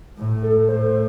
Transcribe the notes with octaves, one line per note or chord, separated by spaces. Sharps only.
A2
A4
A2 C5